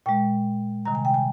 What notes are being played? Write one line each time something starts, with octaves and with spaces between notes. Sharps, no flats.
A#2 G#3 G5
C3 D#3 G3 A#5
G#5
G5
G#5